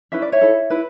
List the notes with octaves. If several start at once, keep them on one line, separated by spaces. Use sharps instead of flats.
C#4 E4 B4 E5
D5
C#5 E5
E4 A4
E4 B4